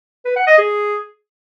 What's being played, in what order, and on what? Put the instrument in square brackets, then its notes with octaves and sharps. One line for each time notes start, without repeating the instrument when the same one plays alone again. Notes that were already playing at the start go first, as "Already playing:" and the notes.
[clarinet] B4
F#5
D#5
G#4